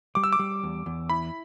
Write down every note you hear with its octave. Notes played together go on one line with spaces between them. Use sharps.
G3 D6
E6
D6
G3
E2
E2
E4 B5